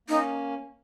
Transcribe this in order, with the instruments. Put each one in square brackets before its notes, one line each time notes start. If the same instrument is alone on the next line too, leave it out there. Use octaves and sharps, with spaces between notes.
[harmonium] A#3 C#4 [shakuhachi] D#4